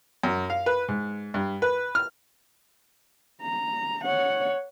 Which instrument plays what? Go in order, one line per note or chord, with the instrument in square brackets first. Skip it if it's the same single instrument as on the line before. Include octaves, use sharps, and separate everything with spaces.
[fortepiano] F#2
F5
B4
G#2
G2
B4
F6
[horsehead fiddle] A#5
C#5 F#5